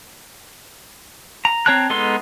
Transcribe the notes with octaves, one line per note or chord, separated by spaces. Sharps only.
A#5
C4 C#5 A5 A#5 F#6
G#3 B3 D#4 A4 C6